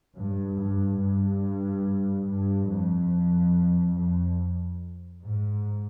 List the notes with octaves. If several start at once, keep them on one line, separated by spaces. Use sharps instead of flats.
G2
G2
G2
G2
F2
F2
G#2